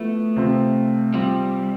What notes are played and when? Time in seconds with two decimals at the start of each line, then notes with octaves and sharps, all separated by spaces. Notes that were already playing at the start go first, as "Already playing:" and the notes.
Already playing: F3 A3 B3 E4
0.36 C3 F3 C4 F4
1.14 F3 G3 C4 F4